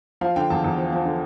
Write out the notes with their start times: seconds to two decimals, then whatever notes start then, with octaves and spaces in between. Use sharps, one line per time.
0.21 F3 F5
0.36 D3 G5
0.50 E2 A5
0.64 E2
0.78 F3
0.92 F3
1.05 D3